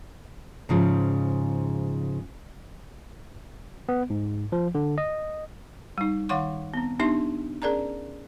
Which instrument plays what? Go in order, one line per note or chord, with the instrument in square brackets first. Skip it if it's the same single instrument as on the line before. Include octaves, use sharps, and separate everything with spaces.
[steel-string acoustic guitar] G#2 C#3 F3
[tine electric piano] B3
G#2
F3
D3
D#5
[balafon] G3 D#4
D#3 F5 F#5 C6 C#6
B3 C4
B3 D4 D#4 G4 E5 C6
C#4 G#4 A#4 D5 A5 A#5